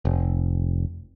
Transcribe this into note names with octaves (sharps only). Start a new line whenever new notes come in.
F1